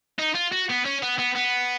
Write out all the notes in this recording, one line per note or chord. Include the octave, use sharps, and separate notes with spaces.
D#4
F4
F#4
B3
C#4
B3
B3
B3